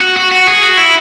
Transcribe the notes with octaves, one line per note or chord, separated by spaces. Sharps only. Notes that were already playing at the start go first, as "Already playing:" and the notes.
F#4
F#4
F#4
G#4
F#4
E4